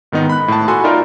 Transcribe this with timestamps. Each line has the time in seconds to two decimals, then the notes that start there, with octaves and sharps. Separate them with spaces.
0.12 G#2 D#3 B3 D#4
0.30 B5 F#6
0.48 A2 A5
0.68 F#4 A4 G#5 B5 C6
0.84 D#4 F4 A#4 D5 E5